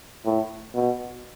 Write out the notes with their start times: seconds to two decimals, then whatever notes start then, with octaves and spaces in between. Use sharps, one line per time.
0.25 A2
0.74 B2